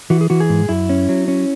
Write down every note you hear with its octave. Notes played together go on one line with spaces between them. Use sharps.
E3 F#4
G#4
E3 F#4
G#4
G#2
F#2 E4
C#4
F#3
C#4